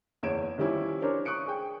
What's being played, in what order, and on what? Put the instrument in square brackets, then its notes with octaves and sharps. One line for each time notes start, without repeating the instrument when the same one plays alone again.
[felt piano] F#1 E2 C#5 G#6 D7 E7
D#3 F3 G3 C#4 E4 G4
C#4 D4 A#4 C5 C#5
C#6 D#6 F#6 C#7 D7
G#4 G5